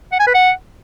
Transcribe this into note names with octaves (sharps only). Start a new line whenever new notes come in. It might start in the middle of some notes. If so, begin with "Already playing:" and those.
F#5
G#5
B4
F#5